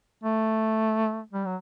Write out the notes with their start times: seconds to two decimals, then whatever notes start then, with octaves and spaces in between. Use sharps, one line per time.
0.24 A3
1.33 G3
1.45 F#3